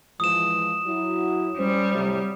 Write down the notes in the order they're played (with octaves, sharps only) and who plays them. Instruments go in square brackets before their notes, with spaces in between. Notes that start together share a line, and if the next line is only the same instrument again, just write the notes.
[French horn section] E3 F3 G#3 [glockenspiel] D#6 E7
[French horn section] F#3 E4 F#4
[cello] G3 [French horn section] C#4 C5
[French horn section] A2 C3 F#3